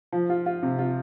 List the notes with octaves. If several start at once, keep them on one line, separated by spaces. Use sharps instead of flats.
F3
F4
F4
C3
F4